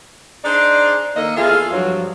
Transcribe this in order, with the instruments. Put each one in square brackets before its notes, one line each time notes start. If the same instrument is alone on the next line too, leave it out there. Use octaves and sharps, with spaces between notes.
[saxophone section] D4 D#4 G#4 C5 D5
D#3 A#3 A4 D#5
E2 F4 G#4 A4 E5 F5
G2 F3 F#3